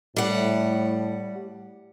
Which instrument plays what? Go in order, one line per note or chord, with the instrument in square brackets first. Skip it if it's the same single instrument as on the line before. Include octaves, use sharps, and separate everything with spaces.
[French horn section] A2 [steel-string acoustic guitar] G3 F#5